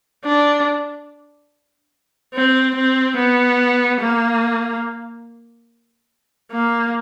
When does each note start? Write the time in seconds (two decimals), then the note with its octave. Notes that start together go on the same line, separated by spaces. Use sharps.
0.24 D4
2.34 C4
2.75 C4
3.17 B3
4.00 A#3
6.52 A#3